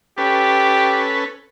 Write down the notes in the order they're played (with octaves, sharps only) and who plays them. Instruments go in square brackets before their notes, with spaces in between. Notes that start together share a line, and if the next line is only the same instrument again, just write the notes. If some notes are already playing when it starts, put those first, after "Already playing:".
[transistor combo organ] C#4 A4 B4 [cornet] G4